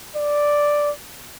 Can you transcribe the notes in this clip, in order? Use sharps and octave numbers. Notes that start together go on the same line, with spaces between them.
D5